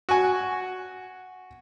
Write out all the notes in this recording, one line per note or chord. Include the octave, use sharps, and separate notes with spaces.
F#4 G#5